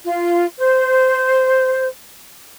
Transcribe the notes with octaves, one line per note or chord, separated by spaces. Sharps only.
F4
C5